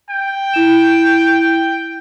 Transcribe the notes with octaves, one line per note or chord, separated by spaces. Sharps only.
G5
E4 E7